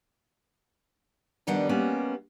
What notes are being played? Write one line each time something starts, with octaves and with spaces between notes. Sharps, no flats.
F2 D#3 G3 B3 D4 F#5
G3 G#3 A#3 B3 C#4